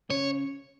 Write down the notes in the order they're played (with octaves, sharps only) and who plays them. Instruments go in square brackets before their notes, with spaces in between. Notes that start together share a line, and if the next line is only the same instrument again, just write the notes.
[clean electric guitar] C#3 [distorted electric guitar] C#5